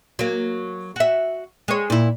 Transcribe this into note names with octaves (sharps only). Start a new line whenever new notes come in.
F#3 A#3
F#4 E5
G#3 C#5
A#2 E4